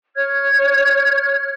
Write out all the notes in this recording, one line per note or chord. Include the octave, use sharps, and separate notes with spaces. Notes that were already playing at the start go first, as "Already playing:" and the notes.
C#5 F6 G#6